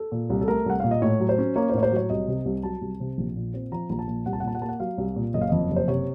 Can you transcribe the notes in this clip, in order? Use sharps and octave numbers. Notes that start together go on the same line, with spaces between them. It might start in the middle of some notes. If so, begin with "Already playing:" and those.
Already playing: A4
A#2
C2
A4
A3 A#4
C2 F#5
A#2 F5
D#5
A2 C#5
F#3
C5
C#4
A#3 C#5
C5
A2 C#5
C5
F#3 C#5
C2 D#5
C3
C2
F#3 A5
C2
C3
A#1
A#2
C4
F3 A#5
A#1 A#5
A5
A#2
C2 F#5
A5
F#5
A#2 A5
F#5
A#3 A5
F#5
F#3 F5
C2
A#2
F#1 D#5
F5
F2 D#5
F#1
C5
C3 C#5